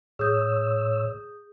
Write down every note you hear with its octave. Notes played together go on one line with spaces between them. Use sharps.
A2 G#4 C#5 D#6 E6 G6